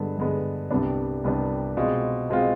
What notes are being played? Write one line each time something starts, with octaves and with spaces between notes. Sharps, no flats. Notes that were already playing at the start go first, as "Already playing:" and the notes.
Already playing: G2 D3 G#3 B3
G2 D3 G#3 B3
C2 C3 G3 B3 D4
C2 C3 G3 B3 D4
B2 G#3 C4 F4
B2 G#3 C4 F4